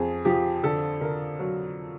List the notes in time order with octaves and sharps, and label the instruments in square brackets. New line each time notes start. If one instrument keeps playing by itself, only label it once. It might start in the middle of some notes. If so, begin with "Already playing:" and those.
Already playing: [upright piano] F2 G#4
F3 G4
D3 A4
D3 A#4
F#3